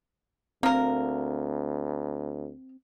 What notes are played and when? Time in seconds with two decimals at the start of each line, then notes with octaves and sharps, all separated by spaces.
0.63 D2 A#3 C4 A#4